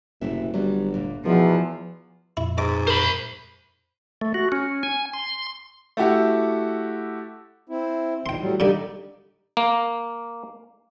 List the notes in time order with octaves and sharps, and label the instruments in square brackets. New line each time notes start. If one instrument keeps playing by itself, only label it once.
[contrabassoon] F#1 [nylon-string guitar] A2 C3 E5
[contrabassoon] G1 [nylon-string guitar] F#3 G3
[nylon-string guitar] D2 A#2
[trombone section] E2 [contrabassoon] B2 [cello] F3 [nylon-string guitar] A#4
[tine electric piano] F2 A#2 [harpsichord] E4
[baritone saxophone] G#2 [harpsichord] D#5 D6
[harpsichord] A#4 [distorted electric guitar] C5 B5
[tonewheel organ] A3
F#4
C#4
G#5
C6
[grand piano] A3 E4 F#4 G4
[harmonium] C4 E4
[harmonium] E2 A#2 D#3 [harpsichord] G5 C6
[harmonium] A2 F#3 G3
[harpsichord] A#2 D3 G3 [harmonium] D#4 D5
[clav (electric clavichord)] A#3